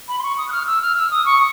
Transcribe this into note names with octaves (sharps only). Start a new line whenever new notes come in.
B5
C6
C#6
D#6
F#6
F6
E6
F6
E6
D#6
C#6